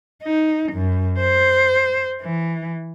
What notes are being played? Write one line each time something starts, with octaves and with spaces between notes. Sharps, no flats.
D#4
F#2
C5
E3